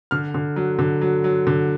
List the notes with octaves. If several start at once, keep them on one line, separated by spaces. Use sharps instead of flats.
D3 F6
D3
F#3
D3
F#3
F#3
D3